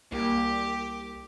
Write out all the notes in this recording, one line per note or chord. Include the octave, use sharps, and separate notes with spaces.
C2 A#3 G4